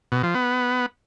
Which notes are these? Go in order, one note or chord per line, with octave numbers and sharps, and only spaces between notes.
B2
F3
B3